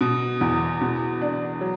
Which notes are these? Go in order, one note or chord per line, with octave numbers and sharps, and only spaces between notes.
B2
E2
B2
D4
F#3